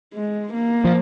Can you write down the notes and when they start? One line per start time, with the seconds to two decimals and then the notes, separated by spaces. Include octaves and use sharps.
0.14 G#3
0.54 A#3
0.85 F3